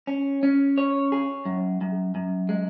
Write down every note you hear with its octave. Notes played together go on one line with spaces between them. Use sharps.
C#4
C#4
C#5
G#4
F#2
F#2
F#2
G#3